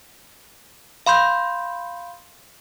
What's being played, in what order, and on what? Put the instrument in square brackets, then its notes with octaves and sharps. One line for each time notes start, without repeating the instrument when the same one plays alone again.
[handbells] F5 B5 C6 G6